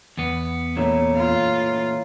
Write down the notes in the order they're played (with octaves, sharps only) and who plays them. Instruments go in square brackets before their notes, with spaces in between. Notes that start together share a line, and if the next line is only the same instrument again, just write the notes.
[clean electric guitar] E2 B3
[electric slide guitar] A#2 E3 A3 [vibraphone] C#5 A#5
[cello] F4